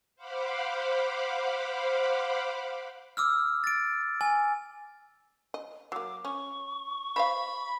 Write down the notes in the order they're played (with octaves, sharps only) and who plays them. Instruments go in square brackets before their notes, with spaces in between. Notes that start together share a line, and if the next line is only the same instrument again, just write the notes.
[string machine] C5 F5 F#5 B5 D6
[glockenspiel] D6 E6 F6
A6 D7
G#5
[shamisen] D#5
[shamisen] F#3 A#3 [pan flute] D6
[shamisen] C#4 [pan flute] C#6
[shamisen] C5 D#5 F5 [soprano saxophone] B5